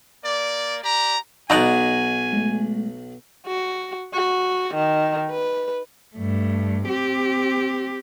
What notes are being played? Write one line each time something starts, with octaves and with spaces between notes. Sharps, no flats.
A#3 D5
G4 D5 A#5
B1 B2 D#4 F#4 D5 G#5 A#5
G#3 A3
F#4
F#4
D#3
B4
G2 A3
C4 G4